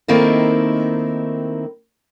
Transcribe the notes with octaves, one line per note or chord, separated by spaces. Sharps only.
D#3 A3 A#3 C4 D#4 E4